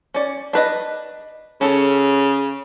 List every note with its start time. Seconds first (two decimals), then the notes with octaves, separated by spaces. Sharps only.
0.14 C#4 D5
0.53 D4 B4 D#5
1.61 C#3 C#4 A4